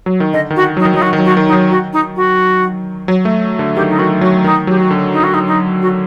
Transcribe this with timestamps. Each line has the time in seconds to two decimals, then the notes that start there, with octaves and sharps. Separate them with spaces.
0.06 F#3
0.20 D#3
0.33 D3 D#5
0.50 D#3
0.56 F#4
0.77 F#3 D#4
0.85 D#3
0.94 F#3 D#4
1.01 D#3 F#4
1.13 D#3
1.19 F#3
1.25 F#4
1.37 D#3
1.48 D#4
1.53 F#3
1.70 F#4
1.93 D#4
2.16 F#4
3.08 F#3
3.25 A3
3.59 D3
3.76 D#3 G4
3.90 D#4
3.99 D#3 F#4
4.21 F#3 F#4
4.44 D#3 D#4
4.67 F#3 G4
4.79 F#4
4.91 D3
5.13 D#4
5.24 F#4
5.34 D#4
5.48 D#4
5.82 F#4